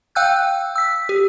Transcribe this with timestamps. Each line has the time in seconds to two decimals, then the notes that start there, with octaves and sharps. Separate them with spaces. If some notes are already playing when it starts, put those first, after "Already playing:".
0.15 F5 G5 E6 F#6 G6
0.76 E6 B6
1.09 G4